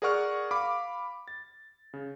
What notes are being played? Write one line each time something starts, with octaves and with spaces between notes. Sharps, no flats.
G#4 A#4 D5 F#5 C#6 F6
F5 B5 D6
A6
C#3